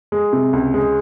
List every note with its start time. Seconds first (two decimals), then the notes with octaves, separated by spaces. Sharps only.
0.12 G#3
0.33 C3
0.53 C#2
0.74 G#3